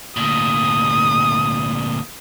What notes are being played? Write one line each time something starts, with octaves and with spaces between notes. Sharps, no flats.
D2 A#2 D#6